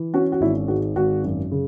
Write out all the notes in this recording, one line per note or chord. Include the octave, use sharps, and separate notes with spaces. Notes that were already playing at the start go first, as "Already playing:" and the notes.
Already playing: E3
C#4 F#4
F#4
G#1 E4
G#2 F#4
G#1 F#4
F#2
C#3